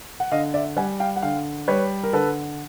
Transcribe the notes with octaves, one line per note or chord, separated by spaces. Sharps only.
F#5
D3 D#5 F5
D5 E5
G3 F#5 G#5
F5 G5
F#5
D3 F5 G5
G3 B4 C#5
A#4
D3 A4 B4